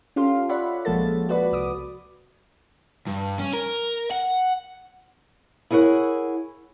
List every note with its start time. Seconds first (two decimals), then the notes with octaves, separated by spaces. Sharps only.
0.16 C#4 F4 G4 A4 F5 C6
0.49 C#5 D5 E5 F#5 B5
0.85 A#1 F3 G#3 A#3 A4 A6
1.29 F#4 B4 D5 B5
1.52 C2 D6 D#6
3.07 G2
3.39 C#4
3.54 A#4
4.11 F#5
5.71 E4 G#4 A#4 C#5 F#5